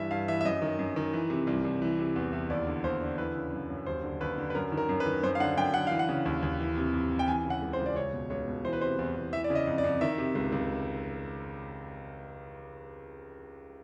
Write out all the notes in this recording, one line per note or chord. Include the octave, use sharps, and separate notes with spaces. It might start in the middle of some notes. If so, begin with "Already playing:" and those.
Already playing: G2 E3 E5
G2 F5
E3 E5
E5
F#2 D#5
D#3
F#2
D#3
E3
C3
C2
C2
E3
C3
E2
E2
D#2 D5
D3
D#2 C5
D3
E3 B4
C#3
F#2
F#2
D#2 C5
D3
D#2 B4
D3
B4
F#2 A#4
D#3
A#4
F#2
B4
D#3
F#2 C5
F5
D3 F#5
F#2 G5
D3 F#5
E3 F5
F#5
C#3
D#2
D#2
E3
C3
F2
F2
G5
E3 G#5
C#3
F#5
C#2
C5
C#2
D5
C#2 C#5
B2
C#2 C#5
B2
E3 C5
B4
C3 C5
E2
E2
E3 E5
D5
C#3
D#5
F2
D5
F2
D#3 E5
C3
C#2
C#2